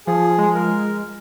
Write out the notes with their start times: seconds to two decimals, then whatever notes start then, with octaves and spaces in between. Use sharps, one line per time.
0.07 F3 G#4
0.38 G#3
0.54 A#4